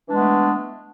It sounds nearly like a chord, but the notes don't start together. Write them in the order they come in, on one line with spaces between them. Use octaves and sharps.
E3 D4 G#3 B3 A3